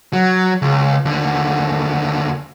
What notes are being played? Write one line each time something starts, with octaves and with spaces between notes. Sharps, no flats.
F#3
C#2
D#2 D3